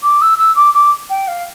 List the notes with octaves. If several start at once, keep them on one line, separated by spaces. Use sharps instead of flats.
D6
E6
E6
D6
D6
G5
F5